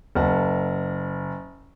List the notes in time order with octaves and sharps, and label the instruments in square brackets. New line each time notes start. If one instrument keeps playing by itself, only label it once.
[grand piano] F#1 A#4 F#5 A5